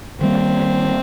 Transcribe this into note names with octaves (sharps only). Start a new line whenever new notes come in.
D#3 G3 A#3 C4